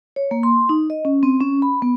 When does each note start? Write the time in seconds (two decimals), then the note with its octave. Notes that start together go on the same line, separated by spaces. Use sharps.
0.16 C#5
0.31 A#3
0.43 C6
0.69 D#4
0.90 D#5
1.05 C#4
1.23 C4
1.41 C#4
1.62 B5
1.82 B3